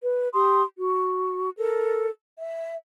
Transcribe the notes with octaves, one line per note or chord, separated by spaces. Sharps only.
B4
G4 C6 D#6
F#4
A4 A#4
E5